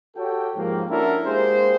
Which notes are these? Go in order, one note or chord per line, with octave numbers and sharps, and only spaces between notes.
F#4 G4 A4 C#5 G5
G#2 F3 A#3
C#4 D4 E4 F#4 A4 A#4
G#3 A#3 G4 G#4 C5